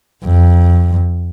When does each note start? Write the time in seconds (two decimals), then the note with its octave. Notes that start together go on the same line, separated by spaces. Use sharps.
0.24 F2